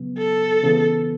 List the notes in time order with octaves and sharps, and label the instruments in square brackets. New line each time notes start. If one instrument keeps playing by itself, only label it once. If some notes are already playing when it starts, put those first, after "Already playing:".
Already playing: [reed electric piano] C#3 F#3 B3
[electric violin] A4
[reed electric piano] C#3 E3 B3